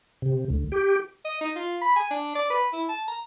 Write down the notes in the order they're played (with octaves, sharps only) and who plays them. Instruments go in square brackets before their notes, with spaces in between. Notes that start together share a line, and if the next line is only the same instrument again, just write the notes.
[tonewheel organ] C3
D2
G4
[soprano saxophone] D#5
D#4
F4
B5
G#5
D4
D5
B4
E4
A5
A#5